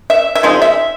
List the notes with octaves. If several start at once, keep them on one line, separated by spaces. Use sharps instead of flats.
E5
E5
F3 G#3 C4 D#4
E5